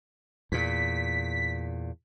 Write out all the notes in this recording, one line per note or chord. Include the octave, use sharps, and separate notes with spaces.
E2 A#2 B6